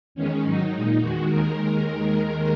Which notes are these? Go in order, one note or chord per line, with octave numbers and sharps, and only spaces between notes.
E2 D#3 G#3 C#4
G#2 D#3 F#3 D#4
A#2 G#3 D#4
E2 D#3 G#3 F#4
D#2 D#3 G#3 A#4